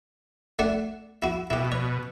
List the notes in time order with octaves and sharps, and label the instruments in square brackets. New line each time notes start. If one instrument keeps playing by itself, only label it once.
[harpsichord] A3 D4 F#5
E4 F#4
[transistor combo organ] B2 [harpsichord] E4 G4
[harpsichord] C#5